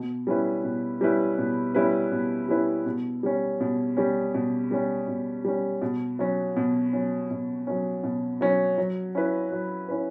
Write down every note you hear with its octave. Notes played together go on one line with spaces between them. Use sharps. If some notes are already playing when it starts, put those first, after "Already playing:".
Already playing: B2
G3 C#4 E4 B4
B2
G3 C#4 E4 B4
B2
G3 C#4 E4 B4
B2
G3 C#4 E4 B4
B2
G3 C#4
B2
G3 C#4
B2
G3 C#4
B2
G3 C#4
B2
F#3 C#4
B2
F#3 C#4
B2
F#3 C#4
B2
F#3 C#4
F#3
C#4 E4 B4
F#3
C#4 E4 B4